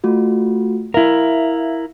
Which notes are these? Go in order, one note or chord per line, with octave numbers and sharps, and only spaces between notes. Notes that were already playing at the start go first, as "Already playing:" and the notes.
A3 F4 F#4
E4 A#4 E5 F5